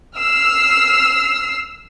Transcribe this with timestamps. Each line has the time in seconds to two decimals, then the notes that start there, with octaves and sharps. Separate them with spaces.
0.16 E6 F6 C7